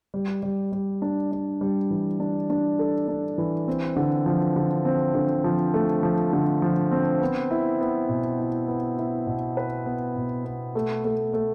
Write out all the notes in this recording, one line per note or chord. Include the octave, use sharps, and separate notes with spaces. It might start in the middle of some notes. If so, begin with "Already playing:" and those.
G3
G3
G3
D4
D4
G3
E3
D4
D4
A4
D4
E3
C4
D3
F3
D3
C4
D3
F3
A3
F3
D3
F3
C4
B3
E4
B3
B2
E4
B3
E4
B2
B4
B3
B2
B3
A3
A3
A3